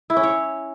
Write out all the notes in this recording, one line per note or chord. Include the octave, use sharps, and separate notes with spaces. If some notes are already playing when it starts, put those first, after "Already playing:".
E4
C#4
C#5